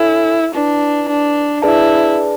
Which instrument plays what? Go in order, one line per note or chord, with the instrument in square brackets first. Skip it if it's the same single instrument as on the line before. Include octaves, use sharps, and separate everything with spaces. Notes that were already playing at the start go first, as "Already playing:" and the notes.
Already playing: [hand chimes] D4 A4 C#5 G#5 [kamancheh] E4
[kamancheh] D4 [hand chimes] E4 B4 D5 A5
[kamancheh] D4
[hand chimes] D4 G#4 B4 D5 A5 [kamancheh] E4